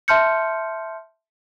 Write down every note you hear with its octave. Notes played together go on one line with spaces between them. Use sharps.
E5 A5 C6 F6 G6 C#7